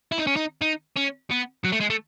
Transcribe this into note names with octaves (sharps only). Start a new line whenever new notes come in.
E4
D#4
C#4
D#4
D#4
C#4
B3
F#3
A3
G#3
A3